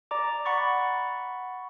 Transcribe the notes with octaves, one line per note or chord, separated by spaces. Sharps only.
D5 A#5 D6
F#5 B5 C#6 A6